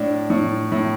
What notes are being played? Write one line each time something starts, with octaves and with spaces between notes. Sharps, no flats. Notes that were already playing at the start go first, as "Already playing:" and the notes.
Already playing: A2 D4
A2
A2